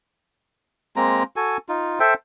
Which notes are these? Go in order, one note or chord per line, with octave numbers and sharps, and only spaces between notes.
G#3 A#3 C4 A#5
F#4 A4 G#5
D#4 F4
A4 C5 E5 G5